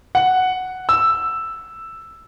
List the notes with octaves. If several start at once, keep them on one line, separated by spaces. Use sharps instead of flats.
F#5
E6